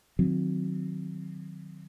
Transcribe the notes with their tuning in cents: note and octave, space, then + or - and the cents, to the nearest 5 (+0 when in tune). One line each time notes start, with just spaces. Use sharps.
D#3 -30 F#3 -20 C4 +0